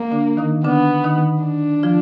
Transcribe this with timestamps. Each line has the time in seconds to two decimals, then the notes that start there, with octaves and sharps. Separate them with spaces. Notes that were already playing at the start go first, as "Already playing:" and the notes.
Already playing: A#3
0.11 D3 D4
0.37 D#3 D#4
0.64 D3 B3 D4
1.04 D#3 D#4
1.44 D4
1.83 F3 F4